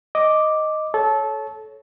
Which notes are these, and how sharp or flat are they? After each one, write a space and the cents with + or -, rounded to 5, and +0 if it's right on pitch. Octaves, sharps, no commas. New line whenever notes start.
D#5 +0 D6 +0
A4 -20 C#5 -5